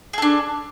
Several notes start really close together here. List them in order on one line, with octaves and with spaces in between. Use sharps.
G#4 A4 D4